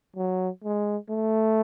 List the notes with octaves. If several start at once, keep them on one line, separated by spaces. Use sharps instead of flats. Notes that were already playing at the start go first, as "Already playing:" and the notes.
F#3
G#3
A3